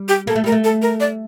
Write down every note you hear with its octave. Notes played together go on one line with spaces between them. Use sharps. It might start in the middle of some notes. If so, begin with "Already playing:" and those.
Already playing: G3
G4
A#3 A4
A3
G3 A#4
A3
A4
A#4
D5